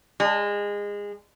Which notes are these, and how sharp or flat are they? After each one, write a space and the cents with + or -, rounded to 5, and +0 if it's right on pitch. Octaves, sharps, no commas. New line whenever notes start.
G#3 -25